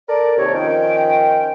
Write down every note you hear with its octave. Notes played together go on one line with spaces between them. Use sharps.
A4 A#4 D5
D#2 C3 C#5
D#3 F3 C#4 G5